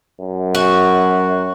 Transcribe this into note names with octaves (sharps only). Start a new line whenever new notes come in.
F#2
F#4